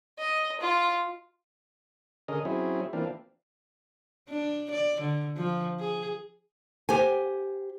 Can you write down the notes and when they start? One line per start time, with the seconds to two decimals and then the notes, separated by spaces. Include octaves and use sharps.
0.19 D#5
0.60 F4
2.28 D3 C#4 G#4 A#4 D#5
2.45 F#3 C4 C#4 E4 G#4
2.93 E3 A#3 C4 D4 F4
4.29 D4
4.71 D5
5.01 D3
5.37 F3
5.80 G#4
6.89 G4 C5 G#5